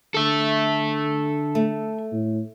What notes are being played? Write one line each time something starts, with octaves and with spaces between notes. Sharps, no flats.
D3 A4 E5
A3
A2